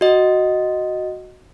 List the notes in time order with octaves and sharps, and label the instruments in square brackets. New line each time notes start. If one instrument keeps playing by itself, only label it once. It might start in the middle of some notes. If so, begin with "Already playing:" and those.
[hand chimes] F#4 D#5